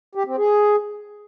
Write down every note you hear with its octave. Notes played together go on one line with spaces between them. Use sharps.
G4
C4
G#4